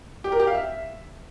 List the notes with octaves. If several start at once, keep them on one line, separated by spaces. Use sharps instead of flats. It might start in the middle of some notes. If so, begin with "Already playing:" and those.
G4
A#4
G4
F5
E5